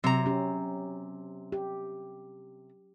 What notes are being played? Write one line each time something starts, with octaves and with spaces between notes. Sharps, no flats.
C3 F#3 A#5
C#4 G4
G4